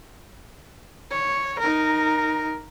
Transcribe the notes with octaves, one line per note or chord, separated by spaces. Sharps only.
C#5
D#4 A#4